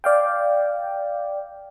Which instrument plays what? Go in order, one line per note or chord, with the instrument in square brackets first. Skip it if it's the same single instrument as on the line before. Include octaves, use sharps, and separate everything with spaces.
[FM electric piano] D5 F5 G5